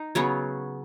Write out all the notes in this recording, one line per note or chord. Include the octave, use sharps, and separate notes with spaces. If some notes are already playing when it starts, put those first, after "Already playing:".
Already playing: D#4
C#3 F#3 B3 C#4